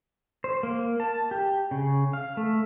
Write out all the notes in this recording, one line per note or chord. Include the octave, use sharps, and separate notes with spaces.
C5
A#3
A5
G4
C#3
F5
A3